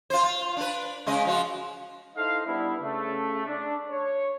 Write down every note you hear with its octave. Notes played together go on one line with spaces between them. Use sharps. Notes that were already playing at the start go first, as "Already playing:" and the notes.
F4 C5
F4
D4 B4
C#3 G#3 D#5
F3 F4 F#4
D#4 E4 A4 C5 D#5 F5
G3 B3 D4 E4
C#3 A3
D4
C#5